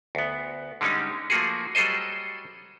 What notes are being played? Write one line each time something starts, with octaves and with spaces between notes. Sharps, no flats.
D2 B3
D3 G3 G#3 C#4 D#4
F3 A3 A#3 F#4 G#4
F#3 G3 G#4 A4 C5 D#5